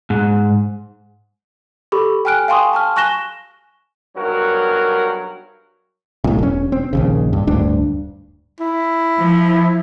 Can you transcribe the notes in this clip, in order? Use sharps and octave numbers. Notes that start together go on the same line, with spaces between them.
G#2
G4 A4 B5 C#6
G5 G#5 F6 F#6 D7
F5 G5 G#5 C6 C#6 D#6
A5 C#6 F6
G#5 C#6 F#6 A#6 E7 G7
B1 G2 F#3 F#4 A#4
B1 A2
E1 C#4
C4
A#1 D#2 C#3
G2
D1 D2 G2 D4
E4
F3